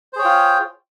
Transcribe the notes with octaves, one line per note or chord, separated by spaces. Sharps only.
F4 G#4 C5 C#5 G5